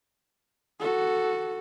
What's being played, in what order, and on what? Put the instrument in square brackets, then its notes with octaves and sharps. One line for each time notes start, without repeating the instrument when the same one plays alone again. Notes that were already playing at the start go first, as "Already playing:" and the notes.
[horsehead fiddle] F#4 A4